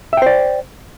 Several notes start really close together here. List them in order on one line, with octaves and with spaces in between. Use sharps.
E5 G5 C5 D5